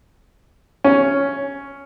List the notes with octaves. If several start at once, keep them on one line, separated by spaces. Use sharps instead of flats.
C#4